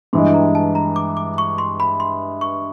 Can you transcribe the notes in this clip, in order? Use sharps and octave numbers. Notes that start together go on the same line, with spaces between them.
G2 E3 G#3 C6
A#5
A5
A#5
D6
D6
C#6
C6
B5
C6
C#6